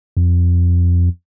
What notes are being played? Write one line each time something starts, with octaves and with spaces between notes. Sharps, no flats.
F2